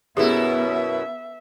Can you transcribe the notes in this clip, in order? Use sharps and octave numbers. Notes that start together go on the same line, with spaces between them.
F#2 B2 B3 E4 G4 G#4 B4 E5